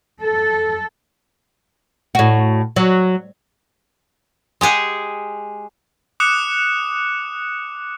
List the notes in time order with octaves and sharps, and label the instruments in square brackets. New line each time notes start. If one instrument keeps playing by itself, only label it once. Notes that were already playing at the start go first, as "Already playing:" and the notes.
[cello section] A4
[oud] A2 F#4
F#3
[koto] G#3 G4 G#4 F#5
[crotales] D6 D#6 F#6 C#7 E7